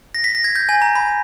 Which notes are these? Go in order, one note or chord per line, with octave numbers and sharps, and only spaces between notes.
A#6
B6
A#6
G#6
G6
G#5
A#5
B5